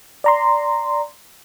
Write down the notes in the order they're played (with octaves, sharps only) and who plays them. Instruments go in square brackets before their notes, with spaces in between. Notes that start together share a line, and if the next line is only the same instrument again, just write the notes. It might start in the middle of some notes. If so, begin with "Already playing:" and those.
[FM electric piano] D5 A#5 C6